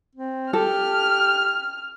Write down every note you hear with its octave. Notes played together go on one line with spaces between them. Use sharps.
C4
G4 A4 F6